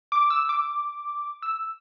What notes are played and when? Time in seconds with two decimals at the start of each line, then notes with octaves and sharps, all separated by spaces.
0.12 D6
0.30 E6
0.49 D6
1.42 E6